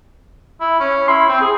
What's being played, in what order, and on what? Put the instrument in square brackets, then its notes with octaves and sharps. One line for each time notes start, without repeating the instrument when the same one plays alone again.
[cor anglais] E4
C#4
[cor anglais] E4 [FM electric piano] C6
[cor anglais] C4
G#4